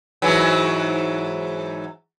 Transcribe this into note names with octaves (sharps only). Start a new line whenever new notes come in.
G#2 E3 F#3